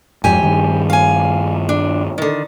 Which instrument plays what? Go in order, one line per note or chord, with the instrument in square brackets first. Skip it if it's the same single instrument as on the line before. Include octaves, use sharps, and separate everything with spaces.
[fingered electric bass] F2 G#2 [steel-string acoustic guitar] G4 G#5
[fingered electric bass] G2 D#3
[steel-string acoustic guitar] F5 G#5
D4
D3 D#3